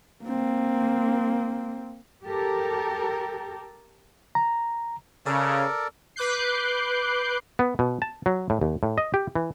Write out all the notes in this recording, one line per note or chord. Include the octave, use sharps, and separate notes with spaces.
A#3 C4
G4 A4 A#4
A#5
C#3 A4 A#4 D5
B4 D6 F#6 G6 C7
B3
B2
A5
F#3
A2
D#2
A2
D#5
G4
E3